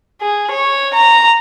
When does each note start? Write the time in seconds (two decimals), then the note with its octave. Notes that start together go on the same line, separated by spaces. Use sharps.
0.21 G#4
0.51 C#5
0.94 A#5